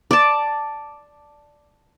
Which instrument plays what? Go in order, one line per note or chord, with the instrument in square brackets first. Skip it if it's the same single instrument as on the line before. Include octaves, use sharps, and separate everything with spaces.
[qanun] D5 A5